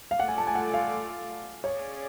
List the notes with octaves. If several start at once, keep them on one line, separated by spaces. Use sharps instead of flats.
F5
A3 F4 A4 D5 F#5
G#5
A5
G#5
F#5
F5
C#4 G#4 C#5 D5